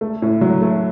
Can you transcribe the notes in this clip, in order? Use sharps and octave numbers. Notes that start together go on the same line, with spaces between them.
A3
A2
F#3
A3